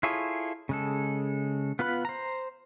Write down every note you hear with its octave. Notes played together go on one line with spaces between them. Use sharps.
E4 F4 G#4 A4 C#5
C#3 G#3 A4
B3 F4 B4 B5
C5 A#5